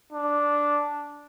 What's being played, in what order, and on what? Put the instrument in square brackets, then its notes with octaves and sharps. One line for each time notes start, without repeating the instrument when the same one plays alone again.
[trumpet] D4